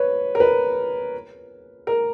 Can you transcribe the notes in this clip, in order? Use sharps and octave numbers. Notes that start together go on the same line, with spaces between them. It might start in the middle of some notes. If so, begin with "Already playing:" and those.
Already playing: B4 C#5
A#4
B4
A#4